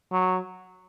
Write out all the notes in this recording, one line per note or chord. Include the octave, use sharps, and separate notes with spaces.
F#3